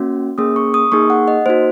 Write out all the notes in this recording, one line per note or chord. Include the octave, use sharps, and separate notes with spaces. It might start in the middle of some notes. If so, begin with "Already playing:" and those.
Already playing: A#3 C#4 F#4
A#3 C#4 G#4 D#6
C#6
D#6
A#3 D#4 G#4 C#6
F#5
D#5
A#3 D#4 F#4 C5